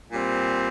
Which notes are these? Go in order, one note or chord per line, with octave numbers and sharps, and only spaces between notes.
A#2 G3 C4